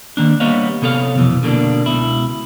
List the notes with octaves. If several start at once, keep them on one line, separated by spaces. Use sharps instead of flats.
D#3 A#3 D4
G3 A#3 B3 C#5 D#5 F5
C3 B3 A4 C#5 F5
F2 B2 E3
B2 D3 A#3 D4
C#2 B2 E4